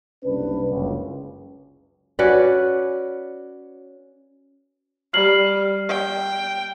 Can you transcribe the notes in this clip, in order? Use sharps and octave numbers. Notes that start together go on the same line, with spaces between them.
F#1 C2 C#4 D4 B4
F#1 C#2
C#4 F#4 B4 D5
G3 F6 C7 F#7
G5